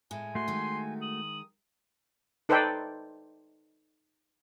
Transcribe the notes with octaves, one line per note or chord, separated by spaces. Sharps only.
A2 G#3 G#5
A3 F#4 C6
D#3 G#3
D#6 F#7
D#4 A4 B4 C5 D5 G5